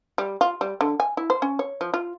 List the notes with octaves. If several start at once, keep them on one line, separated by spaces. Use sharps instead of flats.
G3
F4
G3
D3
G#5
E4
C5
C#4
C#5
F3
F4